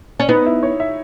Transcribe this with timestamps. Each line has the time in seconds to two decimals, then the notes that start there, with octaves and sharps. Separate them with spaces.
0.20 C#4
0.29 B3 D#4
0.46 E4
0.63 C#5
0.80 E5